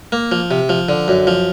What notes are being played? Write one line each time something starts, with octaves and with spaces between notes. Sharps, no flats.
A#3
F3
C3
F3
D3
F#2
F3